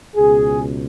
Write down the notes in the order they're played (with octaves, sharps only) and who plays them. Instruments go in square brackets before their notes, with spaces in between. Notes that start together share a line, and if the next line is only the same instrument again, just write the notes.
[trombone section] C#2 B2 G#4